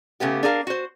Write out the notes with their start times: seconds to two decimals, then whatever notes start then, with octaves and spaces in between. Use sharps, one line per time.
0.20 C#3 A3 B3 G4
0.43 D4 G#4 A#4 F5
0.67 F#4 C5